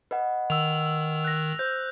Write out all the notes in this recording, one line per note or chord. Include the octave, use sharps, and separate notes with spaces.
B4 D#5 F#5
D#3 E6 F7
F#6 A#6
C5 G6